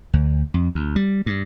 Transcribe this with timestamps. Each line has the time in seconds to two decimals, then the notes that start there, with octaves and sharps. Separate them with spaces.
0.13 D2
0.54 F2
0.75 D2
0.96 G3
1.26 G2